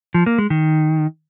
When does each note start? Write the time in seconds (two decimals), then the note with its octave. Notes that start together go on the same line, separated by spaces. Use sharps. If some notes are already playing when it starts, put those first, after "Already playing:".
0.15 F3
0.26 A#3
0.38 G#3
0.50 D#3